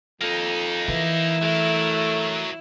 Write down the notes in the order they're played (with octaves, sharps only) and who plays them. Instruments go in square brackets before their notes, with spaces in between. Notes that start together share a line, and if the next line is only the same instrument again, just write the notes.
[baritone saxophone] F2 [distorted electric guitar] A#3 D#4
[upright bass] E3 [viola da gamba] E4
[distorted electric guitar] F#3 A#4 [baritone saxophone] A3